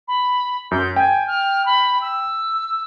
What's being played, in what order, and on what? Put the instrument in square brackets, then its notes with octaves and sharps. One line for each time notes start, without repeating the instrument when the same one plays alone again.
[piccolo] B5
[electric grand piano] F#2 [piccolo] G6
[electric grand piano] G5 [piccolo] G#5
[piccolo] F6
B5
E6